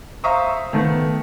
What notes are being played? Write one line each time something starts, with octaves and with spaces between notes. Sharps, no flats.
C5 E5 F5 A#5 C#6 D#6
D#3 A3 B3